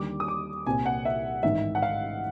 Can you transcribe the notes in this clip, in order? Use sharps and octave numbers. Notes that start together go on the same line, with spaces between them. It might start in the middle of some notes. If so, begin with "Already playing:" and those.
Already playing: D#2 D3 G3 D6
D#6
D6
C2 A#2 G3 C4 G#5
F#5
E5
A1 G#2 D#3 E5
F#5
F5